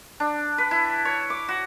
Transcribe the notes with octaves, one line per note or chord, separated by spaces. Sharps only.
D4
B4
E4
C#5
D6
F#4